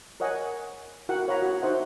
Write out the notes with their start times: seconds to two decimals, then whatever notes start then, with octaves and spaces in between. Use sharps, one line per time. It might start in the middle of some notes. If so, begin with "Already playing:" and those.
0.20 A#4 C#5 D#5 F#5 G#5
1.09 E4 F#4 A#4 F#5 G5
1.28 C#5 F5 F#5 A#5 B5
1.42 F#4
1.62 D#4 C5 E5 F#5